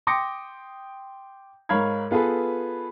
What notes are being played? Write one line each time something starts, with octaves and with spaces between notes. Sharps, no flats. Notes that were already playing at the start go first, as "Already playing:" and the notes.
G5 C6 D6 D#6 A#6 C#7
G#2 A#4 C#5 F5 B5 G#6
B3 F4 G#4 A4 B4